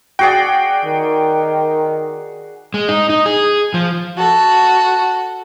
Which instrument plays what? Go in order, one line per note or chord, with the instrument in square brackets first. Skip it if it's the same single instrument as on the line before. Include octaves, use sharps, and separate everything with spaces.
[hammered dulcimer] F#4 G#4 D5 [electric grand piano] G5
[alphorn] D#3
[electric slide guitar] G#3
D#4
D#4
G#4
F3
[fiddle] F#4 A4